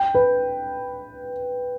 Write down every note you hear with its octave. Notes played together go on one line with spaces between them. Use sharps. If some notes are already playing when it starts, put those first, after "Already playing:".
Already playing: G5
B4